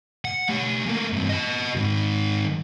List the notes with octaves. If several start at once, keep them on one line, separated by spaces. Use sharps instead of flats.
F#5
A3 G4
A3 A#3
G2 C4
F#4 D#5
G#2 D#3